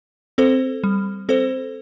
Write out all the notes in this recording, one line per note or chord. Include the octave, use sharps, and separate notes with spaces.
C4 A4 C5
G3
C4 A4 C5